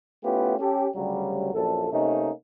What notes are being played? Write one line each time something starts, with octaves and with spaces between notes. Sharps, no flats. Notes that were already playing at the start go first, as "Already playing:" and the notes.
A3 B3 C#4 E4 F4 G4
C#4 G4 A4
D2 C#3 F#3 G3
A#1 F#2 A#2 A4
C3 A3 A#3 C#4 D#4